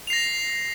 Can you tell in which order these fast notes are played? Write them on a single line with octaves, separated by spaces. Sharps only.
F7 C7 A#6